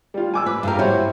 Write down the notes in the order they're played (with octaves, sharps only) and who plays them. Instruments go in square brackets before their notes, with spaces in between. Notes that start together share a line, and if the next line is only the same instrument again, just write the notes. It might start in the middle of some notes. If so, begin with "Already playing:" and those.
[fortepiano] G3 F4
G#5 D6 E6
[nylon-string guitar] B4
G2 F3 A#4
[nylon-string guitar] E4 F#4 [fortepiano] G4 C5 C#5